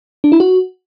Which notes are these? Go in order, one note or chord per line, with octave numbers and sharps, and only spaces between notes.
D4
E4
F#4